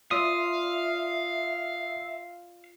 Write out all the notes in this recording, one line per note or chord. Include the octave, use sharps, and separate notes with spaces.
F4 D5 E5 F5 D#6